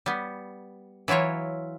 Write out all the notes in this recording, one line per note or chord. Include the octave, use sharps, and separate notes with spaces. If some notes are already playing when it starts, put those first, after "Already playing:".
G3 B3
E3 F#3 E4 F4 C#5